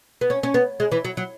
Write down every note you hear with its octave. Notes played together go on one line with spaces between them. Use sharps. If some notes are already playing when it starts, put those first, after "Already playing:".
B3
C#4
C#4
B3
G#3
E3
F#3
F#3